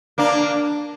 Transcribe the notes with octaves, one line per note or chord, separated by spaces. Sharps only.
A#3 D4